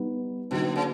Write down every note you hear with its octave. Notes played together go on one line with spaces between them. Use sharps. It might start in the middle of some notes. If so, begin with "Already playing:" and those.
Already playing: G3 B3 D#4
B2 D3 F#3 A#3 D#4 F#4
C#3